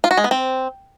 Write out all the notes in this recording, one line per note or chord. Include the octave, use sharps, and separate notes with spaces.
F4
F#4
G#3
B3
C4